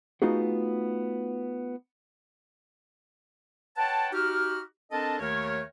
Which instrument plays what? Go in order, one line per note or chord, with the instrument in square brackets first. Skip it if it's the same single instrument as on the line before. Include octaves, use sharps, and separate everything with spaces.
[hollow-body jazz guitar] A3 B3 D#4 F4 F#4 G#4
[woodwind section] B4 C#5 F#5 G5 A5
D#4 F#4 G4 F6
C4 D4 A4 A#4 D#5 A5
D#2 D#3 A3 A#4 C#5